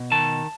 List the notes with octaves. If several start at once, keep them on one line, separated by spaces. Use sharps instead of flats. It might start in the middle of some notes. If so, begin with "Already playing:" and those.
Already playing: B2
D#3 A5